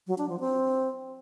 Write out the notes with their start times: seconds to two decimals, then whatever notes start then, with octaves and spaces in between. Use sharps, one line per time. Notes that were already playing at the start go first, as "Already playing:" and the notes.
0.07 F#3
0.18 D4
0.29 F3
0.40 C4